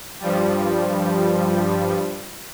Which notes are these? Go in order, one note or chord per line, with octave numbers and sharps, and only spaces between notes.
G2 F3 G3